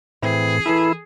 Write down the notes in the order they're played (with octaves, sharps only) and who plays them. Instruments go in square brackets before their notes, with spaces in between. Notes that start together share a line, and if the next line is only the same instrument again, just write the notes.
[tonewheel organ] A2 [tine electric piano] E3 C4 E4 [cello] G#4
[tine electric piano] E3 A4 B5 [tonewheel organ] E4